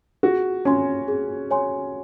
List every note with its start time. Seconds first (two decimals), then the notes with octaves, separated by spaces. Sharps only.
0.23 F#4 G#4
0.65 C#4 C#5 G#5 C6
1.08 G#4
1.51 C#5 G#5 C6